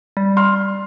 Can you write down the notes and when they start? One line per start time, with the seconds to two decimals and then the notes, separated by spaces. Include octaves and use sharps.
0.17 G3
0.37 C6 F6